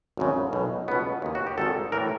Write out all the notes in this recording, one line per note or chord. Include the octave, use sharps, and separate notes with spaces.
G#1 F#2 C#3
B1 B2
C#2 B2 B3
D#2 D#3
F#4
G4
G#1 G#2 D#3 A4
A2 E3 A#4